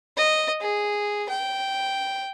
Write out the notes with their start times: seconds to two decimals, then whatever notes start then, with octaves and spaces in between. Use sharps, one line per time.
0.17 D#5
0.61 G#4
1.29 G5